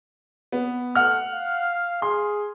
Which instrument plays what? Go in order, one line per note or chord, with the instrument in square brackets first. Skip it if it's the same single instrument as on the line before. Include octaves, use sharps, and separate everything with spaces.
[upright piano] B3
[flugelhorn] A3 [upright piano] F#5 F6
[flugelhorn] F5
[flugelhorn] G#4 [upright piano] C6